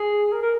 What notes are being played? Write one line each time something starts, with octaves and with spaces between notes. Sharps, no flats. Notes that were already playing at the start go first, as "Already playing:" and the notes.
Already playing: G#4
A#4
A#4